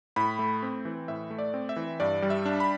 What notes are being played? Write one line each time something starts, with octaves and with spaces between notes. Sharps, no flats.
A2 B5
A3
C4
E3
A2 E5
A3
D5
C4
E5
E3
G2 D5
G3
E5
D4
B5